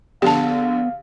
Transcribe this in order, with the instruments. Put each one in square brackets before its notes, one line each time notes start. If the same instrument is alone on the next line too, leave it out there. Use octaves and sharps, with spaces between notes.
[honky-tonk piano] A#1 D3 [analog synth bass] B3 [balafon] G4 A5 [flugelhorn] F5